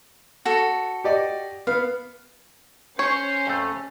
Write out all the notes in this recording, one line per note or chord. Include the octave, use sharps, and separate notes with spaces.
F#4 A4
G4 D5 D#5
B3 F5
C#4 C5 C#5
F2 A3